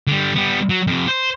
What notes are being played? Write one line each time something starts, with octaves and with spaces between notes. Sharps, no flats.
D3 G3
G3 B3
F#3
F2 C3
C5